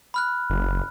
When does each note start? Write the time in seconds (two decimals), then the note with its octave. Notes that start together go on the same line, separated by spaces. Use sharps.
0.14 B5 F6 F#6
0.50 F#1